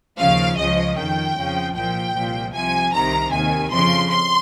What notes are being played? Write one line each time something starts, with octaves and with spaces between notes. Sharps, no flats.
D#2 C#3 F3 F5
C#2 C#3 F3 D#5
F2 D#3 G5
F2 C#3 F3
C2 A#2 F3 G5
C2 A#2 F3
C2 C3 F3 G#5
C2 C3 D#3 A#5
D#2 D#3 G#5
F2 C#3 F3 C6
C6